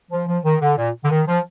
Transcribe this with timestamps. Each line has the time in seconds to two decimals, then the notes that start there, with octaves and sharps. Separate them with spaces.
0.11 F3
0.27 F3
0.44 D#3
0.61 D3
0.77 A#2
1.04 D3
1.10 D#3
1.27 F3